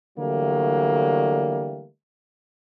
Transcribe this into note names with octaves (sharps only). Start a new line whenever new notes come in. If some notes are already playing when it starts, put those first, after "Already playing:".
D3 E3 F#3 G3 A3 A#3